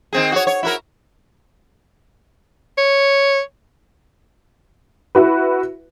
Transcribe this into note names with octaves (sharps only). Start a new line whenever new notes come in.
D#3 C4 G#4
F#4 C#5
C#5
E4 F#4 A#4
C#5
E4 F#4 B4